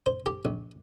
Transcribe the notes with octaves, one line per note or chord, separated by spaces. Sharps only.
C5
G4
A#1